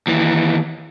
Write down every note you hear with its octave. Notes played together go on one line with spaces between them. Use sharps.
D#2 E3